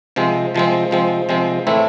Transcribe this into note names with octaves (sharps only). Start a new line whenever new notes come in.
C3 F3 G#3 C4
C3 F3 G#3 C4
C3 F3 G#3 C4
C3 F3 G#3 C4
A2 E3 A3 C4 E4